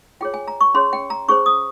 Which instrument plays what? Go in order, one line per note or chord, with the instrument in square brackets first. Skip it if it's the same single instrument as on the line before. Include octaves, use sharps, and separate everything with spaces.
[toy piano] F4 G#4 C#5 G5
G#5
A#5
C#6
C#4 G#4 C#5 C6
G5
A#5
C#4 G#4 C5 C#6
D#6